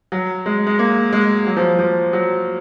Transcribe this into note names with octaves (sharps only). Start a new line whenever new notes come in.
F#3
G#3
G#3
A#3
G#3
F#3
F3
F3
F#3